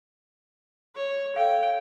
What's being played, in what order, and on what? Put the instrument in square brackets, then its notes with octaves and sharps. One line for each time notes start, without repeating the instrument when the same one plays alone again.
[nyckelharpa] C#5
[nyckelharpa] A4 G5 [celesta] F5